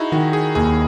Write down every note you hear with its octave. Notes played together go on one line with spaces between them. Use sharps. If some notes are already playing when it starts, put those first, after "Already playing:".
Already playing: D#4 E4 F#4 G#4
D#3 F#4
G#4
D#2 G#4